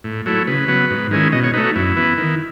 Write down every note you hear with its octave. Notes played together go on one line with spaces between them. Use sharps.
A2
F#3 A3 E4
C#3 B4
F#3 B3
G#2
D#3 G#3 C#4 E4
B2 D#5
C#5
A3 D#4 B4
F#4
F#2 E4
E3 B3
D#3